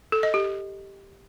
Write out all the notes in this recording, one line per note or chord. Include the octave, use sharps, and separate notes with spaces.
A4
D#5
G4